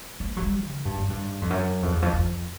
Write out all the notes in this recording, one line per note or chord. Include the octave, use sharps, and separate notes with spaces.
A#3
F#3
G3
C#3
G2
G#2
G2
F2
F#2
F2
E2
F2
F2